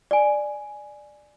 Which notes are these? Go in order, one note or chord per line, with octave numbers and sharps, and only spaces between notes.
D5 G#5